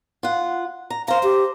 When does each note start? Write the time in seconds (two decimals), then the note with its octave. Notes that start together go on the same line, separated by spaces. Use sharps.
0.23 F4 F#5
0.90 A#5
1.08 C5 F5 A#5
1.23 G4